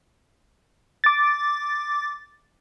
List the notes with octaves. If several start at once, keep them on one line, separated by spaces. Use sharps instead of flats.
D6 A6